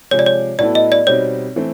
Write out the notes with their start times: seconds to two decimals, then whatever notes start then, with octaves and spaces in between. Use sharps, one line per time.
0.11 C3 F3 G#3 C#5
0.19 D5
0.26 C#5
0.59 A2 F#3 B3 E4 A4 D5
0.75 D#5
0.92 D5
1.07 B2 G3 C4 D#4 C#5
1.56 E3 A3 C4